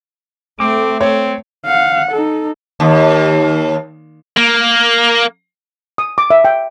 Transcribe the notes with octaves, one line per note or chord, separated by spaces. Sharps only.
A3 C4 D6
C4 C#5
F5 F#5
D#4 A4
D#2
A#3
D#6
D6
E5
G5